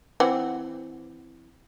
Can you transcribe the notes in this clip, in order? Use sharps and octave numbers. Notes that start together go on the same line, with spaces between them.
E3 C4 F#5